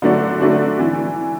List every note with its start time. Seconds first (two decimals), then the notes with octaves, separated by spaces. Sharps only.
0.02 D3 F#3 A3 D4 F#4
0.40 D3 F#3 A3 D4 F#4
0.79 E3